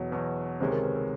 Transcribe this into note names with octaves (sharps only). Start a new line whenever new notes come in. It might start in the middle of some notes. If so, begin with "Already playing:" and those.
Already playing: E2 B2 F#3 C#5
E2 B2 F#3
C#2 C3 D#3 G#3 C#4 C5
A#4
B4
A#4